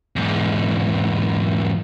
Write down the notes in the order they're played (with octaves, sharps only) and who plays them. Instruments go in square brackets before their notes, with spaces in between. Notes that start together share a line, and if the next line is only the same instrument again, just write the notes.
[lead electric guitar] E2 G#2